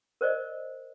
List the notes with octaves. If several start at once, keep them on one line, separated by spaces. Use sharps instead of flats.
A#4 C5 D5 D#5